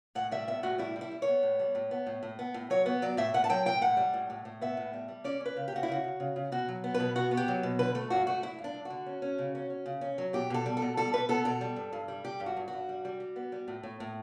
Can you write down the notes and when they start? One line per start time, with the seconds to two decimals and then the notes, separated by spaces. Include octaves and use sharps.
0.15 A2 F#5
0.31 G3 E5
0.48 B3 E5
0.63 A2 F#4
0.78 G3 E4
0.96 G3
1.01 E4
1.11 G3
1.22 C#5
1.27 B3
1.43 A2
1.59 G3
1.75 A2
1.91 B3
2.07 A2
2.23 A2
2.39 B3
2.54 A2
2.70 F#3 C#5
2.86 B3
3.02 F#3 D5
3.17 A2 E5
3.34 A2 F#5
3.44 A5
3.49 F#3 G5
3.66 A2 G5
3.81 A2 F#5
3.97 G3
4.14 A2
4.30 A2
4.45 A2
4.61 B3 E5
4.77 A2
4.93 G3
5.08 G3
5.24 C#4 D5
5.40 C#4
5.46 B4
5.57 C#3
5.68 G4
5.72 C#3 F#4
5.83 E4
5.88 C#3 F#4
6.04 C#3
6.20 C#3
6.36 C#3
6.52 B2 F#4
6.68 F#3
6.84 B3
6.94 B4
7.00 B2
7.16 B3 F#4
7.31 B3
7.37 G4
7.48 F#3
7.63 B2
7.79 D3 B4
7.95 A3 A4
8.10 G2 F#4
8.27 A3 F#4
8.43 G2 E4
8.58 G2
8.64 D4
8.74 G2
8.85 F#4
8.90 D3
9.06 C#4
9.22 C#4
9.38 C#3
9.55 C#4
9.70 C#4
9.86 C#3
10.01 C#4
10.18 F#3
10.33 B2 G4
10.50 B2 A4
10.66 G3
10.77 A4
10.82 B2
10.97 G3 A4
11.13 B2 B4
11.29 B3 A4
11.45 B2 A4
11.61 G3
11.76 G2
11.93 G2
12.08 G3
12.25 G3 G4
12.40 G2
12.46 F#4
12.57 G2
12.68 F#4
12.73 G2
12.89 G3
13.05 G3
13.20 G3
13.36 B3
13.52 G3
13.68 A2
13.83 A2
14.00 A2